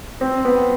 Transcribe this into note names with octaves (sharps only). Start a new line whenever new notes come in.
C4
B3